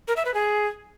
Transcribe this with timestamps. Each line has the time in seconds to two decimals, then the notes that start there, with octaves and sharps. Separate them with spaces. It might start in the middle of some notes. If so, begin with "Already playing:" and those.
0.08 A#4
0.17 E5
0.25 B4
0.34 G#4